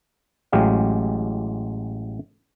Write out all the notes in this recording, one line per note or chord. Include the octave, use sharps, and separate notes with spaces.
A1 F#3 G#3 G4 F5